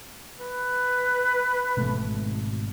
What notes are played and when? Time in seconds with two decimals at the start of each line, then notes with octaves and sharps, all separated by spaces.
0.41 B4
1.77 G#1 B2 A3